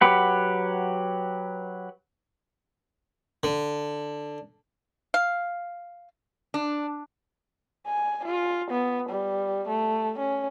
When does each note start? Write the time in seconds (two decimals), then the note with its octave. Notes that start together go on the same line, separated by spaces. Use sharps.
0.01 F#3 G4 B4 F#5
3.43 D3
5.14 F5
6.54 D4
7.86 G#5
8.25 F4
8.70 B3
9.09 G3
9.68 A3
10.19 C#4